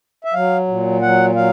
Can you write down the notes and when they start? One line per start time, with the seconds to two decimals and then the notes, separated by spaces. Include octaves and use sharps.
0.24 E5
0.33 F#3 F5
0.68 A#2
1.02 F#3 F#5
1.35 F#3 F5